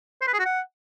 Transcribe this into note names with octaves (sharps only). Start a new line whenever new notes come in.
C5
B4
G#4
F#4
F#5